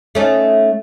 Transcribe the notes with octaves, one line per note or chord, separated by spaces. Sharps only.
A3 C#4 D#4